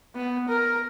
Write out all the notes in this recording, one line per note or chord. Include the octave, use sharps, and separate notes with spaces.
B3
A#4